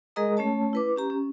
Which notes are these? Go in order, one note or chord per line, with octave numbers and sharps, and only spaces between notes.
G#3 G#4 A#4 D#5 A#5 D#6
A3 C#4 C#5 A5
E4 B4 D6
C#4 G4 A#5
C#4